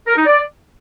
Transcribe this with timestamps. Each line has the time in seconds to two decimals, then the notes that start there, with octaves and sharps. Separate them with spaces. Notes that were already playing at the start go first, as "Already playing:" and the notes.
0.06 A#4
0.16 D#4
0.26 D5